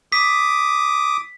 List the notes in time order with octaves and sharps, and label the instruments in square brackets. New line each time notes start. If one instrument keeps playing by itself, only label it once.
[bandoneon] D6 D#6 [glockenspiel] B6